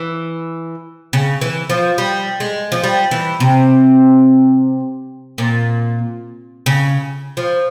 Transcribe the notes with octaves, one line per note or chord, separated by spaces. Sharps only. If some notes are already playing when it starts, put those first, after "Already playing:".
Already playing: E3
C#3
E3
F3
G3
G#3
F3
G3
E3
C3
A#2
C#3
F3